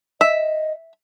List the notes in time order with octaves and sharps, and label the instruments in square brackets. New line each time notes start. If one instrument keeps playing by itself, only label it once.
[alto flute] D#5 [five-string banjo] E5